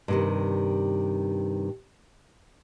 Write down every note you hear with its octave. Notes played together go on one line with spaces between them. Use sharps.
G2 C3 D#3